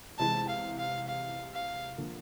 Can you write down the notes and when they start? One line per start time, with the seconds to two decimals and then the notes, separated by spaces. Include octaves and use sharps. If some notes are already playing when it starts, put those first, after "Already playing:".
0.19 C3 E3 G#3 A5
0.49 F5
0.78 F5
1.08 F5
1.53 F5
1.98 D3 F3 A#3